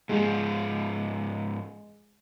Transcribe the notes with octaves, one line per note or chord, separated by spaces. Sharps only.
G#2 F3 G#3